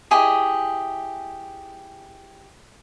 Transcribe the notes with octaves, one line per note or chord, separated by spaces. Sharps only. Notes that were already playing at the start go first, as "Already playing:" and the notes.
E4 G4 G#4 D#5